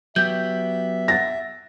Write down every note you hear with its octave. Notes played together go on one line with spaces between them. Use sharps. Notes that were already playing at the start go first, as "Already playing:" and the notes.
F#3 B3 G4 E5 G6
F#5 A6 A#6